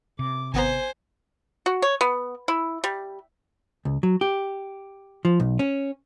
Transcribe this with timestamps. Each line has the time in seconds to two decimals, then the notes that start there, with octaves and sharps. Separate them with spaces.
0.19 C3 D6
0.54 G#1 B3 C5 G#5 A#5
1.66 F#4
1.82 C#5
2.01 B3
2.48 E4
2.84 G3
3.85 C#2
4.03 F#3
4.21 G4
5.25 F3
5.40 B1
5.59 C#4